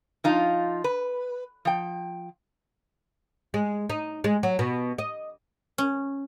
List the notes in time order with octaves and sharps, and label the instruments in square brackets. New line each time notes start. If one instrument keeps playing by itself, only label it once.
[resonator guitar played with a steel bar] F3 D#4 F4
B4
F3 G5
[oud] G#3
D#4
G#3
F#3
B2
D#5
[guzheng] C#4